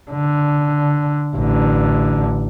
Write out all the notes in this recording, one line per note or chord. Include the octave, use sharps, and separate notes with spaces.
D3
A1 D3